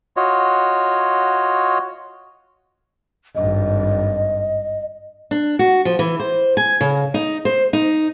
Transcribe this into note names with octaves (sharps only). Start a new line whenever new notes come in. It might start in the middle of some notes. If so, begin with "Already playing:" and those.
F4 F#4 C#5 D#5
G#1 G2 D#5
D4
F#4
F3
E3
C5
G#5
C#3
D#4
C5
D#4